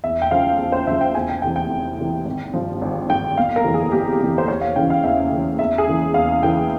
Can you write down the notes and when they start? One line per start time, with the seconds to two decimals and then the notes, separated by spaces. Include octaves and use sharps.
0.04 E2 E5
0.22 G5
0.31 C#3 F3 F5
0.59 E2
0.72 C5
0.86 C#3 F3 E5
1.01 G5
1.15 E2 G#5
1.29 G5
1.42 C3 E3 G5
1.56 G5
1.70 E2
1.98 C3 E3
2.25 G#1
2.54 G2 F3
2.81 G#1
3.09 G2 F3 G5
3.38 G1 F5
3.56 A#4
3.65 F2 C3 E3
3.74 G#4
3.92 G1 G4
4.20 F2 C3 E3
4.38 C5
4.48 E2 C#5
4.61 F5
4.76 C#3 E3 G5
4.90 F5
5.04 E2 E5
5.31 C#3 E3
5.59 E2 E5
5.78 G#4
5.88 C#3 E3
6.14 E2 F5
6.43 C#3 E3 G5